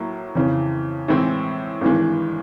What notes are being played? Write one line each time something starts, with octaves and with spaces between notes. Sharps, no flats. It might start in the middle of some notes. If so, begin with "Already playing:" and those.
Already playing: A2 F#3 A#3
F2 C#3 E3
A2 E3 G#3 C4 E4
G#1 G2 E3 G#3